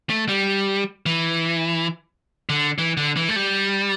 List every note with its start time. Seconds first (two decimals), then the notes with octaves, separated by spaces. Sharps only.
0.10 A3
0.29 G3
1.06 E3
2.49 D3
2.78 E3
2.97 D3
3.17 E3
3.29 A3
3.36 G3